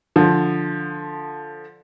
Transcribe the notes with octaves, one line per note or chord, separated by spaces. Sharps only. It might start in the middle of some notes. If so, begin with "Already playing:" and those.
D3 F3